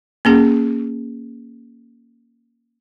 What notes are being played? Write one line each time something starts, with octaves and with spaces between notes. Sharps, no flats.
A#3 C#4 G#4